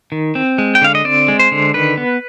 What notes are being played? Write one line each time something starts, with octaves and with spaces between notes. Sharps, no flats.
D#3
C4
G#3
G5
D3 F5
D#5
C4 D5
G#3
C5
D3
D#3 B4
B3